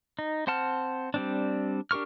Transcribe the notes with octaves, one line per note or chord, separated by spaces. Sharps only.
D#4
C4 C5 F#5 A5 F6
G3 C4 D4
D4 G4 A#4 C#6 F6